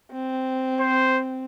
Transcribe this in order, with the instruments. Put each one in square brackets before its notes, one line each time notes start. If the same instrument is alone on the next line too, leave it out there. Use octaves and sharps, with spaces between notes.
[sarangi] C4
[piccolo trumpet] C5